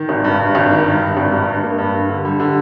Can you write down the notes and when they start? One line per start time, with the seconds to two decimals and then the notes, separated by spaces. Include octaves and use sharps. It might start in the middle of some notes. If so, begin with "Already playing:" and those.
Already playing: D#3
0.09 G#1
0.24 G2
0.39 G2
0.55 G#1
0.70 D#3
0.86 G2
1.02 G2
1.17 G#1
1.31 G2
1.47 G2
1.63 A#3
1.78 G2
1.93 G3
2.09 D3
2.25 G3
2.40 D3